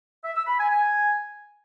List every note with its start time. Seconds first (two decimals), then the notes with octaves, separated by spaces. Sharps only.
0.24 E5
0.36 E6
0.47 B5
0.59 G#5
0.70 G#5